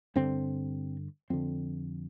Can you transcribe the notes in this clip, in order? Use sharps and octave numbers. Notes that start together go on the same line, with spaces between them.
G2 D3 C4
F2 D3 C4